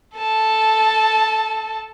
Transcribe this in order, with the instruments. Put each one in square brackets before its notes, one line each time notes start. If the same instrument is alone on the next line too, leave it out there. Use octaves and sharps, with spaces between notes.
[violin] A4 A5